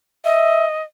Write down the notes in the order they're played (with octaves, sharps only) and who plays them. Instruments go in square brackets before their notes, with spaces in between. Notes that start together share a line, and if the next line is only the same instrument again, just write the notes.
[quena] D#5 [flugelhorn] E5